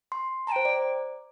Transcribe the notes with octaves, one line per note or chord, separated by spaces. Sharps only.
C6
A5 A#5
C5 G5
D5